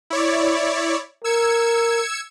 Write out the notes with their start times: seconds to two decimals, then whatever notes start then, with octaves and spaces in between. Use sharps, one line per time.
0.10 E4 C#5 D5
1.24 A#4 E6 G#6 C#7